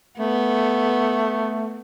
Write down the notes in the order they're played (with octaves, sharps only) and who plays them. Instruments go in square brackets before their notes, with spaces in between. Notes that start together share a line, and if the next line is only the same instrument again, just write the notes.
[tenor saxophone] A3 [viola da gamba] B3